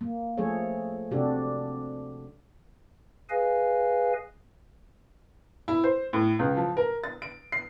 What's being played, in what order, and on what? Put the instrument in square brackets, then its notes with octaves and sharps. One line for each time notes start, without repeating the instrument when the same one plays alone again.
[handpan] A#3
F3 A3 G#4 A4 C#5
C3 D4 F#4 G4 A4
[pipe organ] G#4 B4 D#5 F5 G#5
[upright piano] E4
C5
A2
C#2
F3
A#4
A6
D7
C7